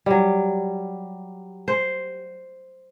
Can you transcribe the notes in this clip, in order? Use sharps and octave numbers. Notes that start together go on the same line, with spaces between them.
F#3 G3
C5